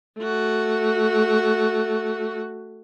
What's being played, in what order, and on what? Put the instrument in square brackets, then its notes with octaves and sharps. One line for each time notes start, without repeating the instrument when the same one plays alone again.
[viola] A3 F#4